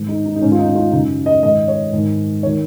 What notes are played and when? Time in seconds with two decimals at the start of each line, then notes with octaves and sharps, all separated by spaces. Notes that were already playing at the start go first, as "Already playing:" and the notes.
Already playing: G#2 D#3
0.08 D#4
0.25 D#4
0.36 D#4
0.42 G#2 D#3 C#4
0.52 F4
0.59 D#4
0.69 D#4
0.75 F4
0.92 F#2 C#3 D#4
1.26 D#5
1.43 G#2 D#5
1.46 D#3
1.68 C#5
1.93 G#2 D#3
2.43 C#5
2.46 D#3